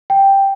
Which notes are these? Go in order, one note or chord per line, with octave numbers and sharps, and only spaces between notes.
G5